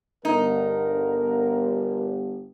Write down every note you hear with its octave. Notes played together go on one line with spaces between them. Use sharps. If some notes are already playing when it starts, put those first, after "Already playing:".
G1 D#4 A#4